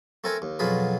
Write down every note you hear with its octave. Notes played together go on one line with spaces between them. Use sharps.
A3 C4 A4 A#4 G#5
D#2
F2 B2 F#3 F4 G#4 B4